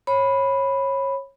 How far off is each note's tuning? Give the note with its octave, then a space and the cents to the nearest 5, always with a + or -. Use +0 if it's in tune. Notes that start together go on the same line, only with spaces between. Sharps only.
C#5 -25 B5 +0